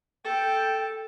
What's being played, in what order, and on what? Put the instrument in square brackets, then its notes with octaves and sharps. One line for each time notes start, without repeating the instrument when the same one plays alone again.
[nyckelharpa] A4 [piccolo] G5